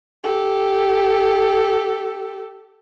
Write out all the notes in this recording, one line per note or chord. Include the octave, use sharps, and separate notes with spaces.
G4 A4